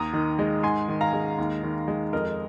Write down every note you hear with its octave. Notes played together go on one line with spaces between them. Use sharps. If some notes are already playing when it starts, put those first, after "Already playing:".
Already playing: D#2 A#5 D#6
D#3
G#3
G#2 G#5 C6
D#3
F5 A#5
G#3
D#2
D#3
G#3
F2 A#4 D#5